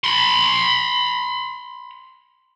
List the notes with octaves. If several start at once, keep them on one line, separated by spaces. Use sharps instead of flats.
B5 C6